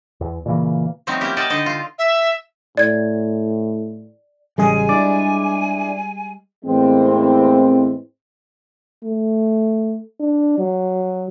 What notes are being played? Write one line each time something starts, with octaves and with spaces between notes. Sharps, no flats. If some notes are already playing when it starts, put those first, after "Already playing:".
E2
A#2 C#3 E3 A#3
F3 F#3 A3 B3 C4 D#4
A#3 B3 C#4 E4 G4
D5 D#5 F#5 G5 A5
D3 D#4 A4 D#5
F4
E5
A2 D5 G#6
A1 C#3 G3 G#3 G#4 G#5
D4 E4 G#4 D5
E2 A2 E3 G#3 A#3 C4
A3
D4
F#3